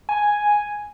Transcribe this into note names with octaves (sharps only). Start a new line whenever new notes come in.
G#5